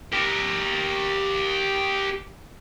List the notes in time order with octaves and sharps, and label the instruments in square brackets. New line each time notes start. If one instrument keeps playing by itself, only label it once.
[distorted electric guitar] G4 A#4